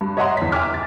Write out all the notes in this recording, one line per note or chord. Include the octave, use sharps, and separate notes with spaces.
G2
C#5 D#5 E5 F#5 A#5 C6
E2 B6
E5 G5 G#5 D6 F6
D6 A6